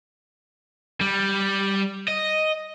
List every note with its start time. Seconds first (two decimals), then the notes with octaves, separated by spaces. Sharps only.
1.01 G3
2.08 D#5